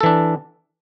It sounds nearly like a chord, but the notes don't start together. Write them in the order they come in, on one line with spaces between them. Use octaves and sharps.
A4 E3 D4